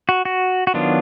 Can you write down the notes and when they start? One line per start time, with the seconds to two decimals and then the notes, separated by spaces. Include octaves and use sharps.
0.09 F#4
0.25 F#4
0.67 F#4
0.74 D#3 F#3 B3 D4 F4